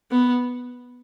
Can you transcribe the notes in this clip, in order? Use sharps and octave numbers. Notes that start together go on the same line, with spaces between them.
B3